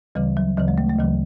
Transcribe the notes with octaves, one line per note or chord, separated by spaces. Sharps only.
D2 C#3 E3 G3
F#3
D2 C#3 E3 F#3
G#3
A3
A3
D2 C#3 E3 F#3